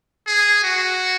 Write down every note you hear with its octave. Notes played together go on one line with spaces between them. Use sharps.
G#4
F#4